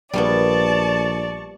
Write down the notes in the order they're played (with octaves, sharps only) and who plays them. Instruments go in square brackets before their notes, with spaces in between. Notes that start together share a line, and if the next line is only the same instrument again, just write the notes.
[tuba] A#1 [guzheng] G3 A#3 B3 [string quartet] D5 [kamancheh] A5 C#6